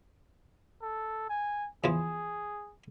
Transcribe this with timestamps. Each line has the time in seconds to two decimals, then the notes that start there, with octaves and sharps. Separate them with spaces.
0.82 A4
1.30 G#5
1.84 E2 E3 F3 G#4